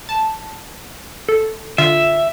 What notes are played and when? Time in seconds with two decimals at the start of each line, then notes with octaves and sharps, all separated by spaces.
0.09 A5
1.29 A4
1.78 D3 F4 E5